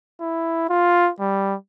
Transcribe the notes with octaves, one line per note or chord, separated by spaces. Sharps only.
E4
F4
G3